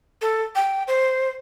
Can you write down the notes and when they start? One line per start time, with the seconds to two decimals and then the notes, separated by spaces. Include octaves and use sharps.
0.22 A4
0.55 G5
0.88 C5